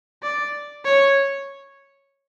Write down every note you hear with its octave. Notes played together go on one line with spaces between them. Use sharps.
D5
C#5